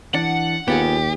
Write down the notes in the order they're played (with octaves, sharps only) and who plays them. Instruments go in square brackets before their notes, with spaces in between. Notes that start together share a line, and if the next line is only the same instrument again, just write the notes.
[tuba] E3 [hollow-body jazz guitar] D4 [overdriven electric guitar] F#5
[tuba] D#2 [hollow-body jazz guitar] B3 F4 G#4 [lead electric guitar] G4